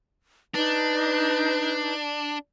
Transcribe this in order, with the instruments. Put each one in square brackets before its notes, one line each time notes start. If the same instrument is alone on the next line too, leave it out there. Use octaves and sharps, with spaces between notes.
[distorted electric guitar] D4 [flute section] D#4 B4